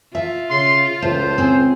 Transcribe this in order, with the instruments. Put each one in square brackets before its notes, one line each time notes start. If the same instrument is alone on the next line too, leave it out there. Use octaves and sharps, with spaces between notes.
[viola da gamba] F4 [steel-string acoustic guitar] E5
[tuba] C#3 [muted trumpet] C6
[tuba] C#2 [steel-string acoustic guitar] A3 [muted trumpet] C5
[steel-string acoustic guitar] C4 G#4